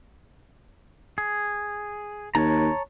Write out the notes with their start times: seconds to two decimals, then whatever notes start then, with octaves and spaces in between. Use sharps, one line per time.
1.18 G#4
2.35 D#2 C#5 A5 A#5